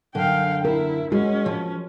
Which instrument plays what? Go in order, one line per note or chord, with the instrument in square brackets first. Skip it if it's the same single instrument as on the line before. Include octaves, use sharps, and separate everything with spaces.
[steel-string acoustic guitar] F#2 D3 [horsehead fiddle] F5 G5
[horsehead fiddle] E4 [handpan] A#4
[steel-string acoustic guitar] G#3 [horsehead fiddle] C#4 [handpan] F#4
[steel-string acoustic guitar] F3